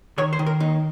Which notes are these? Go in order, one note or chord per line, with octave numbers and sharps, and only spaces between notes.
D#3 C#5
C5
D#3
A#4
D#2 D#4